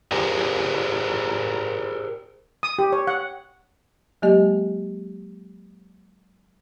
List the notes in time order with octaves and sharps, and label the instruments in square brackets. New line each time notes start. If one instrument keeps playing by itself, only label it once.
[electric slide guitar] G4 G#4 A#4 C5
[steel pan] D#6
G4
C#5
F#5
[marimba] F#3 G#3 A#3 G4 D#5